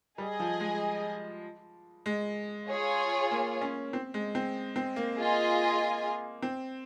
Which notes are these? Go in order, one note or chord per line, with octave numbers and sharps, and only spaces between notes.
G3 G#4 D#5 G#5
F3
G#3
G#3
F4 G#4 C#5 G#5
A#3
C#4
C4
G#3
C4
C4
A#3
F4 G#4 D#5 G#5
C4